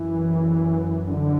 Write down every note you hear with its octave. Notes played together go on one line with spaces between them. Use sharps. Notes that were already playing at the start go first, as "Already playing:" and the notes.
Already playing: F#2 E3
D3